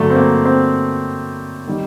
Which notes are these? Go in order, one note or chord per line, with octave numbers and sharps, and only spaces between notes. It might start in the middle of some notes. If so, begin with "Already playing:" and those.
Already playing: G2 D3 F#3 A3
C4
A#3
C4
D#3 G3